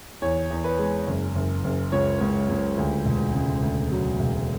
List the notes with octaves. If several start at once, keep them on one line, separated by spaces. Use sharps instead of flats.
E2 C#5
E2
B4
G#3
F#1
F#1
F#1
C#2 C#5
C#2
C#2
D2
E1
C#3
D2
F#3
E1